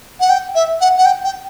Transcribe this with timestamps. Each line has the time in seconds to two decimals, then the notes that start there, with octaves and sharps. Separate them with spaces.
0.20 F#5
0.30 G5
0.55 E5
0.81 F#5
0.98 F#5
1.05 G5
1.24 G5